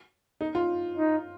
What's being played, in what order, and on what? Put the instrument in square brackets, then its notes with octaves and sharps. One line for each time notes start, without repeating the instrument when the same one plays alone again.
[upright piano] D#4
F4
[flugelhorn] D#4